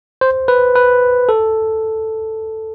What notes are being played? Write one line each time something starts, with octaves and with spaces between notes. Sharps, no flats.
C5
B4
B4
A4